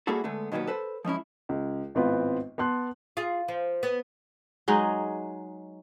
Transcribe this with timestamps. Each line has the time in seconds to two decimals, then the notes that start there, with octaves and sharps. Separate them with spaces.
0.07 G3 A#3 E4 F#4 G#4 A4
0.24 D3 G#3 A3 B3 D4
0.52 B2 D#3 F#3 G3 A#3 B3
0.67 A4 B4 C5
1.05 F3 G#3 C#4 E4
1.49 C#2
1.95 G#1 A2 B3 C4 F4 B4
2.58 B3 A5 C6 F#6
3.17 F4 G#4
3.48 F3
3.83 B3
4.68 F#3 G#3 D#4